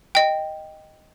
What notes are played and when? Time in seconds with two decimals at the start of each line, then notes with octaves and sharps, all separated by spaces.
0.15 D#5 G5